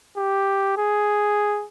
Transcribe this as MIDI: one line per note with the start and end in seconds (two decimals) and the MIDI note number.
0.17 0.75 67
0.77 1.66 68